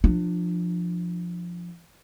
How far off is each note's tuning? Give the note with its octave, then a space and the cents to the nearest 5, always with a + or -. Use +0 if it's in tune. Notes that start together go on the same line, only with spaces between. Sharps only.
F3 +0 D4 +25